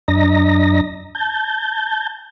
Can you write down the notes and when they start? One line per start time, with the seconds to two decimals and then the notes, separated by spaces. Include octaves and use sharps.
0.08 F#2 D4 D#5 A#5 A#6
1.15 A5 G6